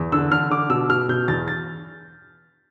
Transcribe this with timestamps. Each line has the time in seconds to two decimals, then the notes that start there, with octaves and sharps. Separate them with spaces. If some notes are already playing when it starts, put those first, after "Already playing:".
Already playing: E2
0.12 D3 E6
0.31 D3 F6
0.50 D3 D6
0.70 B2 E6
0.89 B2 F6
1.09 B2 G6
1.28 E2 A6
1.48 A6